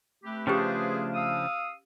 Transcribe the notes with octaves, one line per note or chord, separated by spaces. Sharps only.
A3 C4 G4 B4
C#3 F3 C#4 D4 G4 G#4 B4 C5
F5 D#6 E6